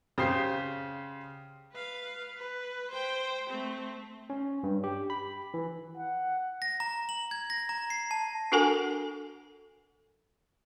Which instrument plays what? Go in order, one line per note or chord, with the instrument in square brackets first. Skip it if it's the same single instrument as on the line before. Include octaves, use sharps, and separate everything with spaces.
[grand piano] C#3 G4 C5 C7
[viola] B4 F5
B4
C5 G5
A3 C4
[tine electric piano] C#4
G2
G4
B5
E3
[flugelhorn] F#5
[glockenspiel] A#6
A#5
F#7
G#6
A#6
A#5
C7
A5
[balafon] D4 F#4 A4 A#4 F#5 G#5